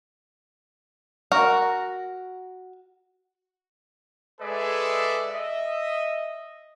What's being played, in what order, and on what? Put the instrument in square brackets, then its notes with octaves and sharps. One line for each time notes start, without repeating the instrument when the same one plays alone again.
[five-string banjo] F#4 A#4
[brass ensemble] G#3 G#4 A4 B4 D5 E5
D#5 E5